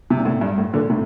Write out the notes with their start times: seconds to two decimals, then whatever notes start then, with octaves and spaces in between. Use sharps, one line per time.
0.10 C3
0.18 A#2
0.25 A2
0.41 G2
0.58 A2
0.73 A#2 D3
0.90 A2 C3